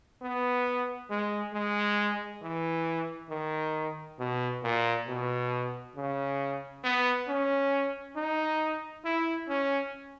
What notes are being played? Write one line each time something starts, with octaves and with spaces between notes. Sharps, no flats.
B3
G#3
G#3
E3
D#3
B2
A#2
B2
C#3
B3
C#4
D#4
E4
C#4